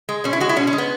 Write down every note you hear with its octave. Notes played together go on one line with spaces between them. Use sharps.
G#3
B2 C#4
E4
G#3 F#4
E4
B2 C#4
C#4
G#3
B3